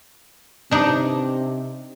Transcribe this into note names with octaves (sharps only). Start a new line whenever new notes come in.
C3 D4 D#4